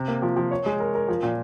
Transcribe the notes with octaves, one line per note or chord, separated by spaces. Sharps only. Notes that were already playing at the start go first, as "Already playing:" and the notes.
Already playing: C3
A#3
F3
F3
C#5
G#3
A#4
A#4
F3
A#2